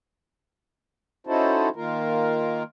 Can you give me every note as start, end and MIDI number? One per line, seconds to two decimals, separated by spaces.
1.27 1.69 61
1.27 1.69 63
1.27 1.69 64
1.27 1.69 66
1.27 1.69 69
1.27 1.69 72
1.76 2.63 51
1.76 2.63 58
1.76 2.63 65
1.76 2.63 70